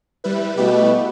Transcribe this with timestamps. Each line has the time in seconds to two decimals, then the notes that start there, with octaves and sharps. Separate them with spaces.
0.24 G3 E4 B4
0.56 B2 A3 E4 G4 B4